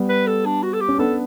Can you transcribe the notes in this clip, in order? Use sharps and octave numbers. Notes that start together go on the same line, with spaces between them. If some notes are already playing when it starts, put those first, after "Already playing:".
Already playing: G3 B3
B4
A4
D4
F#4
A4
G4
C#4
B3 D4 A4